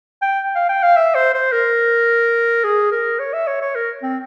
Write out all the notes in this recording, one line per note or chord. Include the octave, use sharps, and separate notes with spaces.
G5
F5
G5
F5
E5
C5
C5
A#4
G#4
A#4
C#5
E5
C#5
C#5
A#4
C4